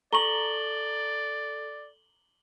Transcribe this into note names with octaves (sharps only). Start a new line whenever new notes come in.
A4 D5 A#5 C#6 F#7 G7